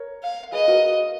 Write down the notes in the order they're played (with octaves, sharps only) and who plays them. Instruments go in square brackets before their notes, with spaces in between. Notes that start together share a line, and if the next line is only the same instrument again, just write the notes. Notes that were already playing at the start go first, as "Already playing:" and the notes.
Already playing: [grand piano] A#4 C#5
[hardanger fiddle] F5
[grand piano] G#4 B4 [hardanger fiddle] D#5
[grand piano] F#4 A#4